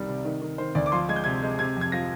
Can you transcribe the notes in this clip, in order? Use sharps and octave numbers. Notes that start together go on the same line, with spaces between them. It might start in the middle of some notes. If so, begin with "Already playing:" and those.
Already playing: C2 D#3 G3 D5
C3
D#3
D#3
D#3 C5
D2 D5
D6
F3 C6
G#3 G#6
G6
C3 G#6
G#3
C3 G#6
F2
G#6
F3 A#6